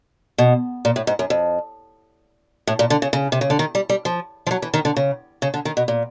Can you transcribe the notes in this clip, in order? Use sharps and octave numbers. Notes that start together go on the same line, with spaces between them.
B2
A#2
A2
G#2
F#2
F2
A2
A#2
D3
C#3
C#3
C3
C#3
D3
D#3
G3
G3
F3
F3
F#3
E3
D#3
D3
C#3
C#3
D3
D#3
B2
A#2